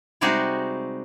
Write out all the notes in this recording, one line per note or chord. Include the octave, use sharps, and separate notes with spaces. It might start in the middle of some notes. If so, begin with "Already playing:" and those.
C3 G3 G#3 D#4 F#4 G#4